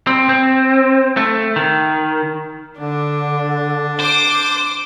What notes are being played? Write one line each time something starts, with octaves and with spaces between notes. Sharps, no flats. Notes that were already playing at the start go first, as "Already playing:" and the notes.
C4
C4
A3
D#3
D3 D4
C5 D6